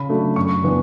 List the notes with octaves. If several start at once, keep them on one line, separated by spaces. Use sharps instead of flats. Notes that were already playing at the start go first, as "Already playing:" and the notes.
Already playing: C#3 B5
F#3 A3 D4
F#2 C#6
C#3 E3 B3 D4